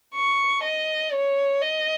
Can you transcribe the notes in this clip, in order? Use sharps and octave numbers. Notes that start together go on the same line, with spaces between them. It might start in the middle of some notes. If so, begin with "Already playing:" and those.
C#6
D#5
C#5
D#5